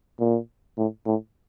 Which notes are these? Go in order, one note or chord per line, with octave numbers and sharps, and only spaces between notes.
A#2
A2
A2